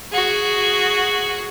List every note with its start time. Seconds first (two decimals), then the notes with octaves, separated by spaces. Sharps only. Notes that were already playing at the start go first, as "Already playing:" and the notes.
0.12 F#4 G#4